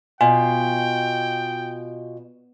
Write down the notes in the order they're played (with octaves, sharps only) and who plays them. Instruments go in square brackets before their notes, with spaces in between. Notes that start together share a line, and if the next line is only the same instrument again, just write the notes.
[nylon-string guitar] B2 [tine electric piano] F4 [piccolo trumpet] G5 [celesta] G#5